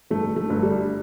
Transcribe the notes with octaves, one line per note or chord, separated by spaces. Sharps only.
G1 A3
A3
G1
G3